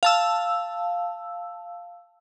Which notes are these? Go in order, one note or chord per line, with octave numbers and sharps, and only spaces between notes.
F5 A5 E6